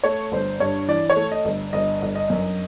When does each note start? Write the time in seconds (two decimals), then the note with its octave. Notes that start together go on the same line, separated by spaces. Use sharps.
0.04 A3 C#5
0.32 G1 C5
0.60 G2 C#5
0.88 E3 D5
1.10 C#5
1.16 A3
1.32 D#5
1.45 G1
1.73 G1 D#5
2.02 G1
2.15 D#5
2.30 F#2